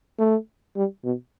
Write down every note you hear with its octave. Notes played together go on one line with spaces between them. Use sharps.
A3
G3
B2